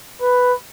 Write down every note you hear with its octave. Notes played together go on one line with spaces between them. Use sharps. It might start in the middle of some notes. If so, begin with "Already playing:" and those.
B4